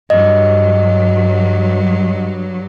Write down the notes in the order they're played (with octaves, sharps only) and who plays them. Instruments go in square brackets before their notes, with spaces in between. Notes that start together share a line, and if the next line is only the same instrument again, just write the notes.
[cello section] G2 F#3 [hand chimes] D#5